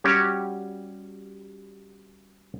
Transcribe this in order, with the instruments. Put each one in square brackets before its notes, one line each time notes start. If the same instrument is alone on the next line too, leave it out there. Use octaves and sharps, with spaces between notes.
[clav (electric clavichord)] G3 C#4 F#4 G4 C#5